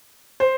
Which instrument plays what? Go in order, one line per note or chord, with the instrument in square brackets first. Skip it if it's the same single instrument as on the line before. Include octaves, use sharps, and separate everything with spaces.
[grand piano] C5